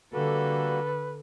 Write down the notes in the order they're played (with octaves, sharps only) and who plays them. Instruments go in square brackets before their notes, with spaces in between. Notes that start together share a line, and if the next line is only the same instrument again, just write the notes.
[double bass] D3 [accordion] G3 A#3 F#4 [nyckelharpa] A4 [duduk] B4